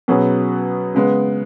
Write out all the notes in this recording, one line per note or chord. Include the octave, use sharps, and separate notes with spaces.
B2 F#3 C#4 G#4 B4
C#3 G#3 B3